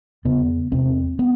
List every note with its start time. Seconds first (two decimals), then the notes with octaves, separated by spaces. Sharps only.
0.25 E2 C#3 B3
0.72 E2 C3 C4
1.19 B3